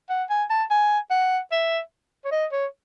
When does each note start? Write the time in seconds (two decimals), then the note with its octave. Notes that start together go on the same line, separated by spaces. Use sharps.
0.09 F#5
0.30 G#5
0.50 A5
0.70 G#5
1.10 F#5
1.52 E5
2.25 C#5
2.32 D#5
2.52 C#5